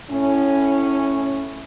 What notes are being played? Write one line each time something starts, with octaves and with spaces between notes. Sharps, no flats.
A2 C#4